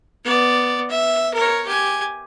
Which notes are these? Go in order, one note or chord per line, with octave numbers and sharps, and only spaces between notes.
B3 D5
E5
A#4 C#5
G4 G#5